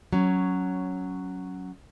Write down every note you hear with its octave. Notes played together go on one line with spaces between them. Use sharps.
F#3 C#4